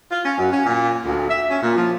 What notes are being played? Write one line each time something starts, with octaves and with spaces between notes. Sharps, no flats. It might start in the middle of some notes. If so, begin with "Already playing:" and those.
F4
C#4
F#2
C#4
A#2
D2
E5
C#4
A#2
F3